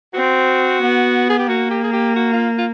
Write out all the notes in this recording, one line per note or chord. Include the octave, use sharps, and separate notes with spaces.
C4 F#4
B3
G#4
G4
A#3 F#4
G4
G#4
G4
F#4
F4
F4